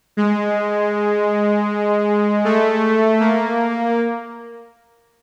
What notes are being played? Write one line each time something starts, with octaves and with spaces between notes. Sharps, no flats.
G#3
A3
A#3